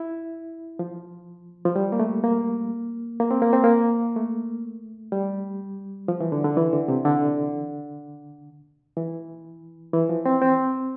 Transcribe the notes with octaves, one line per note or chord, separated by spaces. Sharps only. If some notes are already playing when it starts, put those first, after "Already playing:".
Already playing: E4
F3
F3
G3
A#3
A3
A#3
A#3
C4
A#3
C4
A#3
A3
G3
F3
E3
D3
D3
E3
D3
C3
D3
E3
E3
F3
C4
C4